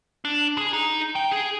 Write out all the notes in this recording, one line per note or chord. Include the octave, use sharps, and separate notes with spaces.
D4
G#4
D#4
G5
G#4